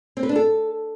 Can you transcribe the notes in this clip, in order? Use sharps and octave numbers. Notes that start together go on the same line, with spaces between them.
C4
B4
D4
A4